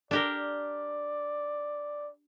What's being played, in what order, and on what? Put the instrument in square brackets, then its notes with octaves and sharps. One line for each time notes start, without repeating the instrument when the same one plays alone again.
[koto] D4 G4 A#4 [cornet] D5